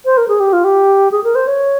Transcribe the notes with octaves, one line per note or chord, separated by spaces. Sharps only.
C5
A#4
G#4
G4
F4
G4
G#4
A#4
C5
C#5